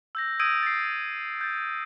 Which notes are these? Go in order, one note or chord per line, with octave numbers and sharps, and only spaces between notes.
E6 G6 A#6
D#6 E6 G6 G#6 D7 D#7
A6 C7
G6 A6